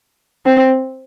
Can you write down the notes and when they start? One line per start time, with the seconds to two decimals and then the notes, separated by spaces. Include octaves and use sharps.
0.46 C4